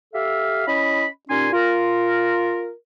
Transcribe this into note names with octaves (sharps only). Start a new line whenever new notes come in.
G4 A4 E5 F5
C#4 E4 D#5 B5
A#2 C#4 D#4 G4 G#5 C6
F4 A#4